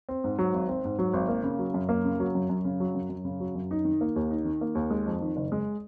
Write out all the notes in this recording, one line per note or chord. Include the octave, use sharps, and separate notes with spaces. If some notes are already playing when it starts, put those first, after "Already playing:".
C4
G#2
F#3
G#1
C4
G#2
F#3
G#1
A#3
C#3
F#3
F#2
A#3
C#3
F#3
F#2
F#2
C#3
F#3
F#2
F#2
C#3
F#3
F#2
D#4
D#3
A#3
D#2
D#4
D#3
A#3
D#2
G#3
F2
D#3
F#1
G#3